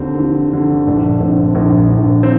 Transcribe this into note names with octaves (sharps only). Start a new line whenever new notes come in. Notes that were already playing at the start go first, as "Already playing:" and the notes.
Already playing: D#2 D3 C4
D3
D3
A#1 D4
A#1 C4
A#1
A#1
D#3 C4